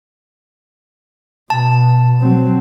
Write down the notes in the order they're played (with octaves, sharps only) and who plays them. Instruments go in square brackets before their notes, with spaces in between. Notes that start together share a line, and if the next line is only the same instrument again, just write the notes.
[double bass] B2 [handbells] A5
[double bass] F#3 C4